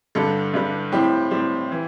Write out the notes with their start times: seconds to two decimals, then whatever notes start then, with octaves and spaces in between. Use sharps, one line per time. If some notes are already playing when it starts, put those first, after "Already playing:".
0.15 G2 D3 G3 A4
0.54 G2 D3 G3
0.92 A2 G3 C4 G4
1.31 A2 G3 C4
1.72 E3